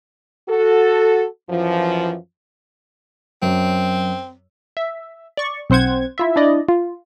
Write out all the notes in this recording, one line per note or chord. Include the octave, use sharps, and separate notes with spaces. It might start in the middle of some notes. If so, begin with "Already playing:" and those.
F#4 A4
F#2 E3 F3
F#2 C4
E5
D5 C#6
B1 C4 C5 F#5 G#6
E4 F4 E5
D4 E4 D5 D#5
F4